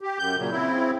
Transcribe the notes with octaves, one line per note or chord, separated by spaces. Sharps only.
G4
F#2 G6
A#2 C#3 F#3
C#3 C4 E4